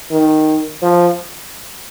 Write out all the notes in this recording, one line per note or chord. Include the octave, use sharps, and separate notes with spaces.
D#3
F3